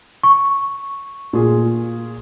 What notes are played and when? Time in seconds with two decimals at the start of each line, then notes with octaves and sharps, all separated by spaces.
0.24 C#6
1.33 A#2 F4 G#4